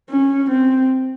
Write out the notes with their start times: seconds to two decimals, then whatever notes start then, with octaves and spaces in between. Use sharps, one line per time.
0.09 C#4
0.50 C4